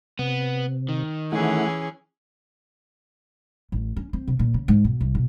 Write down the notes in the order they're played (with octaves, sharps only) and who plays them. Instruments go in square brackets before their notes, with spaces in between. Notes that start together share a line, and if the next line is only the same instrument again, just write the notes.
[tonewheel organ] C3 [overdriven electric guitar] B3
[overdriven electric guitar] D#3
[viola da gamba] E3 C#4 G#4 [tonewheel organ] A3 E4 F#5
[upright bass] A1
C#4
C4
C3
A#2
C#3
G#2
B2
C2
B2